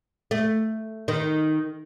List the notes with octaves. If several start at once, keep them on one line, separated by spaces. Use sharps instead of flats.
A3
D#3